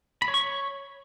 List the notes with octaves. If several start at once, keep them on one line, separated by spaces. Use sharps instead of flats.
B5
C#5
C#6
C#5